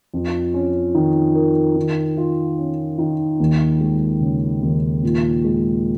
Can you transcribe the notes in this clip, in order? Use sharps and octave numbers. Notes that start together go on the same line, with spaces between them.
F2
C#4
D#3
A#4
D#3
F4
C#4
D#3
D#2
G#3
C#3
D#2
A#2
G#3